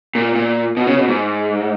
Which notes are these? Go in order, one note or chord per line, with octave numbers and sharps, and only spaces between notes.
A#2
A#2
B2
C#3
B2
G#2